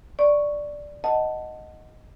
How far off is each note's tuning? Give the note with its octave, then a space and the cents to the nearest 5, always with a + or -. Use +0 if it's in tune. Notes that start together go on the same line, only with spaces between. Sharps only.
D5 +0 C#6 +0
D#5 +0 F#5 +0 A5 +5